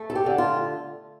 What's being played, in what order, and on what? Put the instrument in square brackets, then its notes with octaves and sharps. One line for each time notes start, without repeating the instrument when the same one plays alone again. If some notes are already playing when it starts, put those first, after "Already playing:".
Already playing: [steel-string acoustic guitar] A3
A4
G4
D3
F4